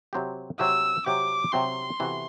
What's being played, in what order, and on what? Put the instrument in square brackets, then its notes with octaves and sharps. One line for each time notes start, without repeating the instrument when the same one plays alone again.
[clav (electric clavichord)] C3 F#3 C4 G4
[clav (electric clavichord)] C3 F#3 C4 G4 [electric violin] E6
[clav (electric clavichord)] C3 F#3 C4 G4 [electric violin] D6
[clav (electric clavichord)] C3 F#3 C4 G4 [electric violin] C6
[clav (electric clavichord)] C3 E3 B3 F#4 A4